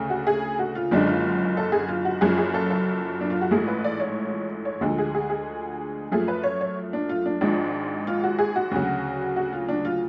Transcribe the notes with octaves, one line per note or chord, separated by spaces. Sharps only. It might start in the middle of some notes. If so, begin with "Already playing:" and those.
Already playing: D2 C#3 A3
F#4
G#4
F#4
F4
F#1 F#2 D3 G#3 D4
F4
A4
G#4
F4
F#4
F#1 F#2 F3 G#4
G#4
A4
A4
D4
F4
F#4
A1 G#2 F3 A3 G#4
B4
D5
C#5
C#5
D2 D3 F3 G#3 A4
G#4
G#4
G#4
F#2 F3 A3 G#4
B4
C#5
C#5
D4
F4
D4
G#1 G#2 F3 G#3 D4
F4
F#4
G#4
F#4
D2 C#3 F#3
F#4
F4
D4
F4